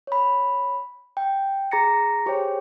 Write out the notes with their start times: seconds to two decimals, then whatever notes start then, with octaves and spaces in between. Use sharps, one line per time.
0.07 C#5 B5
1.17 G5
1.71 G#4 A#5 A6 A#6 C#7
2.26 G4 G#4 C5 C#5 G5